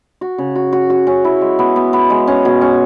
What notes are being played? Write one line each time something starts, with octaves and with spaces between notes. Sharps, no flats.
F#4
C#3
F#4
F#4
F#4
C#4
E4
G#3
B3
B3
B3
G#3
C#4
B2
C#4